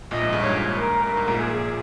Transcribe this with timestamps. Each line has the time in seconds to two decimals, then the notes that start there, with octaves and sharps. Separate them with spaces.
0.11 A#1 A#2 D#5
0.21 G#2
0.33 G2
0.43 G#2 C#5
0.59 G#2
0.75 A#4
1.07 G2
1.17 G#2
1.27 A#1 A#2
1.38 G#4